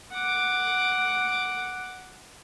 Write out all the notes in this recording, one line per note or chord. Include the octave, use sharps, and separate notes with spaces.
F#5 D6